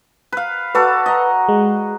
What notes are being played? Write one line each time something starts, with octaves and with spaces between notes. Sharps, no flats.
B4 F5
F#4 A4 B4 D5
D#5 A#5
G#3